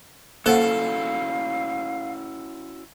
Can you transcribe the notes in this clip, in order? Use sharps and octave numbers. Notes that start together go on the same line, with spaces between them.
A#3 C#4 E4 F#4 A4 C5 F5 F#5